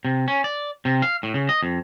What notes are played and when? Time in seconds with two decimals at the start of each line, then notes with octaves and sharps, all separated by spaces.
0.05 C3
0.28 C#4
0.44 D5
0.85 C3
1.02 F5
1.23 A2
1.34 C#3
1.49 D#5
1.63 F2